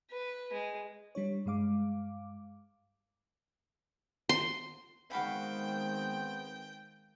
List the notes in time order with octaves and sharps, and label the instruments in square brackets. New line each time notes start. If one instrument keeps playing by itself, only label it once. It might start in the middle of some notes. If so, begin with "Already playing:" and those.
[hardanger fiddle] B4
G#3
[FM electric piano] G3 D4 C#5
G2 G#3 F5 D6
[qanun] C6
[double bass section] D#3 G#3 [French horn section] B3 C4 [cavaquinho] F#4 F5 B5 [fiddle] G5